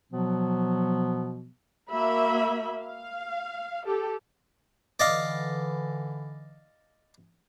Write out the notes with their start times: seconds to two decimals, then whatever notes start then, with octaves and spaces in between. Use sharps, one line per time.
0.12 B2 F3 F#3 B3
1.90 A#3 F#4 E5 B5
2.80 F5
3.86 G4 A4
5.00 D3 E3 D5 D#5 F5